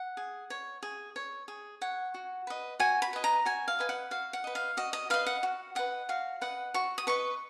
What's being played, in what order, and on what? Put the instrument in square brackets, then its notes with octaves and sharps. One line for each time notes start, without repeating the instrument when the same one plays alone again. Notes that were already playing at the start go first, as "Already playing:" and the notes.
Already playing: [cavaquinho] F#5
G#4
C#5
G#4
C#5
G#4
C#5 F#5
F#4
B4 D#5
F#4 G#5
B5
B4 D#5
A#5
F#4 G#5
F5
B4 D#5 G#5
F#5
F#4 F5
F#5
B4 D#5
F5
F#4 D#5
D#5
B4 D#5 F5
F#5
F#4
B4 D#5 F#5
F#4 F5
B4 D#5 F#5
F#4 C#6
D#6
B4 D#5 C#6